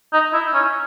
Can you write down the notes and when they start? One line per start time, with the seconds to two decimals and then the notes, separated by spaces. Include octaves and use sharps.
0.13 D#4
0.33 E4
0.54 C#4